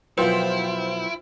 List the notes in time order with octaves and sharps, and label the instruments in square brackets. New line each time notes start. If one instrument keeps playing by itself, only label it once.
[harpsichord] F#2 B2 F3 [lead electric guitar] E4 [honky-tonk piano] F4 C5 G5 [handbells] B4